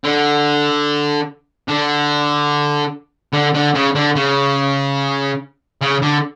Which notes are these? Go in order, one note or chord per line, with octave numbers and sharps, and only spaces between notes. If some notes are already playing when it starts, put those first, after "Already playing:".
D3
D3
D3
D3
C#3
D3
C#3
C#3
D3